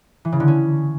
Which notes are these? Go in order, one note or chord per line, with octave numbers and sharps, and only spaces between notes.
E3
C#3
D3
C#4